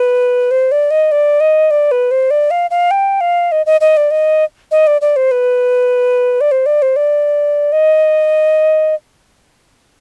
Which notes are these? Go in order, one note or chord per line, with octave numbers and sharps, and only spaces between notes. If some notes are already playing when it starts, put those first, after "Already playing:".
Already playing: B4
C5
D5
D#5
D5
D#5
D5
B4
C5
D5
F5
F5
G5
F5
D#5
D#5
D#5
D5
D#5
D#5
D5
D5
C5
B4
D5
C5
D5
C5
D5
D#5